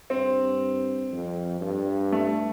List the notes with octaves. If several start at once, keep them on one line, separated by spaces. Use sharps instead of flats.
G2 C4
F2
G2
A3